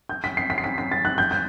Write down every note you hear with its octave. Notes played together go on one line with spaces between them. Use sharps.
G6
B6
C7
B6
C7
B6
B6
A6
F#6
G6
G6